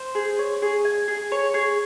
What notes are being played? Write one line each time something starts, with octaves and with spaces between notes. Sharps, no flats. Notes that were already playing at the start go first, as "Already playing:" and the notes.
Already playing: C5
G#4
C#5
G#4
G#5
G#4
C#5
G#4